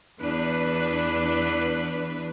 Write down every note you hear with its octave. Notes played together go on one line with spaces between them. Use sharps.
E2 D4 B4